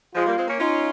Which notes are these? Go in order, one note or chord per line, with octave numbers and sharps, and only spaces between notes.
F3 G#3 F4
G3 A#3
G#3 C4
A#3 C#4
C#4 D#4 F4